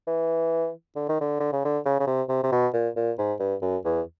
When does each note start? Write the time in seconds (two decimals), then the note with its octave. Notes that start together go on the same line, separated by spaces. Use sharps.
0.07 E3
0.95 D3
1.09 D#3
1.21 D3
1.40 D3
1.53 C#3
1.65 D3
1.85 C#3
1.99 C#3
2.07 C3
2.29 C3
2.43 C3
2.52 B2
2.73 A#2
2.96 A#2
3.18 G#2
3.39 G2
3.61 F#2
3.85 E2